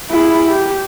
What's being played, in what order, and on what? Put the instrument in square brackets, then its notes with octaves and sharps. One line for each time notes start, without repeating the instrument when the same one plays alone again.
[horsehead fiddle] E4 G#4
G4